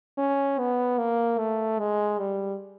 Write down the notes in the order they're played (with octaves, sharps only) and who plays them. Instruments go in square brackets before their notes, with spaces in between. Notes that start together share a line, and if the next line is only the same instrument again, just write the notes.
[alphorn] C#4
B3
A#3
A3
G#3
G3